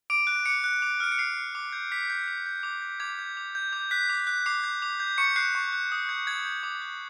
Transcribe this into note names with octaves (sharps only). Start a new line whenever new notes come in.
D6 D7
F#6
D6 C#7
F#6
D6
F6 D7
C#7
D6 C7
F6
D6
G6
D6 B6
G6
D6
G6
D6
G6
D6 G#6
G6
D6
G6
D6 G6
F#6 B6
D6
F#6
D6 C7
G6
D6
G6
C#6 C#7
F#6 C7
C#6
F#6
D#6
G6
D#6 G#6
G6
D6
F#6